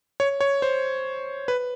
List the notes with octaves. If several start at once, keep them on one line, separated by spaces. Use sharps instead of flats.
C#5
C#5
C5
B4